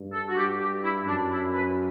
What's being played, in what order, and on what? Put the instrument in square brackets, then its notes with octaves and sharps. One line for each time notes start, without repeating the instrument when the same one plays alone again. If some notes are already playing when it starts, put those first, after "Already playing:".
Already playing: [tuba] G2
[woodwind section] A4
F#4
[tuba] G2 [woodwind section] G4
[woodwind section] G4
E4
[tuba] F#2 [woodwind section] D4
[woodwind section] E4
B4